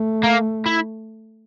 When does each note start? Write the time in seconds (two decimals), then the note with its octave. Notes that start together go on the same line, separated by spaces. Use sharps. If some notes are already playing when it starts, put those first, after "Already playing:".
Already playing: A3
0.23 A#3
0.66 E4